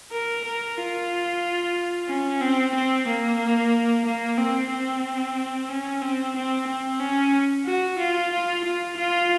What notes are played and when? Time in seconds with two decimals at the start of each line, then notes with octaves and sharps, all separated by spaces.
0.12 A#4
0.44 A#4
0.77 F4
2.09 C#4
2.41 C4
2.75 C4
3.08 A#3
4.05 A#3
4.38 C4
4.71 C4
5.69 C#4
6.02 C4
6.36 C4
6.67 C4
7.00 C#4
7.66 F#4
7.99 F4
8.32 F4
8.65 F4
8.97 F4